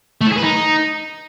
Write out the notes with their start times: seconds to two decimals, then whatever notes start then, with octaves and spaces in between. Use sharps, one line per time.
0.21 A3
0.27 E4
0.32 G#4
0.37 B4
0.43 D#4